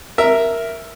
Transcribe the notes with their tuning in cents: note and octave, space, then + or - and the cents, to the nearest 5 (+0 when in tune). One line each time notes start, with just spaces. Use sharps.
A#4 +0 E5 +0